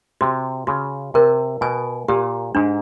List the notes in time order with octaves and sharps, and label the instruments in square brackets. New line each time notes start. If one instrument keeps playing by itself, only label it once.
[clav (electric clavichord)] C3 [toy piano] F#4
[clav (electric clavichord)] C#3 [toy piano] F#4
[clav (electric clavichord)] C3 [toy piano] A#4
[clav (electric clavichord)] B2 [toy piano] G#5
[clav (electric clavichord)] A#2 [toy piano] G4
[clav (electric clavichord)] G#2 [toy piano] D4